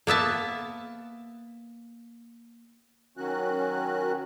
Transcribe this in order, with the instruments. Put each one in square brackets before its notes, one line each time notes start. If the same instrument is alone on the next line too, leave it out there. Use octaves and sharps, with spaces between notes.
[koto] A#3 B3 E5 A5
[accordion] D#3 F#3 C#4 F#4 F#6